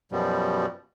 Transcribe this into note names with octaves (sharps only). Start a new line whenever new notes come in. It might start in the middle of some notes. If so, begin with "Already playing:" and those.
F#2 B2 F3 G3